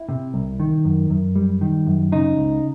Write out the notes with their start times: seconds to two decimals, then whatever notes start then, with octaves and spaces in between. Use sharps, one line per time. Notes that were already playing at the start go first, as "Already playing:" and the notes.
Already playing: E4
0.09 C3
0.34 C2
0.60 D#3
0.85 F#2
1.10 F#2
1.36 G3
1.61 D#3
1.86 F#2
2.12 C#3 D#4
2.37 C#2